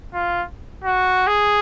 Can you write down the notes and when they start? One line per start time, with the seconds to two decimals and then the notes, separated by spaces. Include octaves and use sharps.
0.14 F4
0.84 F#4
1.27 G#4